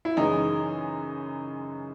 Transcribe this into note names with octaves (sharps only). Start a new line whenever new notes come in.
E4
F#2 C#3 E3 G#3 D#4